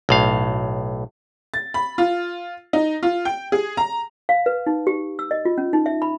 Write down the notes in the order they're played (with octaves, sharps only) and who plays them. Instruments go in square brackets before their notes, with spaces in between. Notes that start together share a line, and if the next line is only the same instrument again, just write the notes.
[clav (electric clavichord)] B1 A2 F5
[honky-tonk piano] A6
B5
F4
D#4
F4
G5
G#4
A#5
[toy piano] F5
B4
D#4
G4
E6
D#5
F4
C#4
D#4
E5
B5